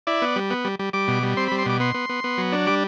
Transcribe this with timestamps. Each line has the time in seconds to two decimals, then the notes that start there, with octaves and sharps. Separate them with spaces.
0.07 E4 D5
0.22 B3
0.36 G3
0.51 B3
0.65 G3
0.79 G3
0.93 G3 D6
1.08 B2
1.23 G3
1.37 C4 C6
1.48 B5
1.52 G3
1.59 C6
1.66 B2 D6
1.80 B3 C6
1.94 B3
2.09 B3
2.24 B3
2.38 F#3
2.52 D4
2.67 G3 D6